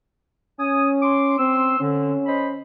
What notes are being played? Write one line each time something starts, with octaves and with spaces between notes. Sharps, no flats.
C#4 G#5 D#6
C6 D6
C4 C6 E6
D3 C#4
C5 D#5 B5